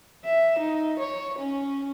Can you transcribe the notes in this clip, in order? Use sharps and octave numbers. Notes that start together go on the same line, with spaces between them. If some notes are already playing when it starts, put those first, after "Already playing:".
E5
D#4
C#5
C#4